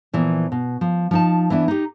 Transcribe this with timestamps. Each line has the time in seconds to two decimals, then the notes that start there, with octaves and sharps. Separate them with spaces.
0.13 A#2 E3 F3 B3
0.52 B2
0.81 F3
1.11 F3 D#4 A5
1.50 E3 B3 D4 E4
1.68 D#4 G4